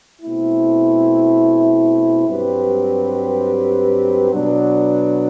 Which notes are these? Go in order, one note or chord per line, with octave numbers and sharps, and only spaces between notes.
B2 A3 C4 E4
G2 F#3 C4 G4 B4
B2 F#3 B3 D4